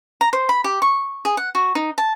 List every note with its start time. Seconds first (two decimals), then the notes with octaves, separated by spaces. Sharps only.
0.21 A#5
0.33 C5
0.49 B5
0.64 G4
0.82 C#6
1.25 G#4
1.37 F#5
1.55 F#4
1.75 D#4
1.98 A5